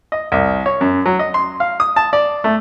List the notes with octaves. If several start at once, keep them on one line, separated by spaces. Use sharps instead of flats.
D#5
C2
C#5
F#2
F#3
D#5
C6
F5
D#6
A5
D5
A3